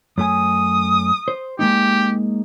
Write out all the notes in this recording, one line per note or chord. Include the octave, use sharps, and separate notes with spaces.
F#2 A3 G#5 D#6
C5
G#3 A#3 D#4 G4